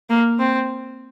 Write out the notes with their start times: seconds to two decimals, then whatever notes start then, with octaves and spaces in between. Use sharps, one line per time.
0.10 A#3
0.39 C4